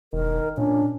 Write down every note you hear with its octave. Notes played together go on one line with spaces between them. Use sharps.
E1 D#3 A#4
A#2 C#4 D4